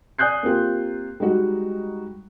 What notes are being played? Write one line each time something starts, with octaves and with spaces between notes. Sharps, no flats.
D5 G#5 D#6 F#6 G6 C7
A#3 C4 F4 G4
G3 G#3 D#4 F#4